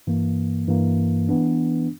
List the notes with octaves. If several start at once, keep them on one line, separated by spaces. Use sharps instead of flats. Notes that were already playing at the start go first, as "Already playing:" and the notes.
G2 E3 A#3
G2 E3 A#3
E3 B3 D4